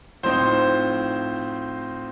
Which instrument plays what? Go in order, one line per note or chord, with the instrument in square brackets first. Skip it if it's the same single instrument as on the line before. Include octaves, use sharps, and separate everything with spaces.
[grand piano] A2 F3 C4 D#4 C5